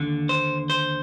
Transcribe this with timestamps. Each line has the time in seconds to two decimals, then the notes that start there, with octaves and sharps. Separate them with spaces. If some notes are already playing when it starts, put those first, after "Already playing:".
Already playing: D#2 D3
0.29 C5
0.70 C5